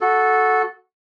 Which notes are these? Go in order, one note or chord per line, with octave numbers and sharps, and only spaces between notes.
F#4 A4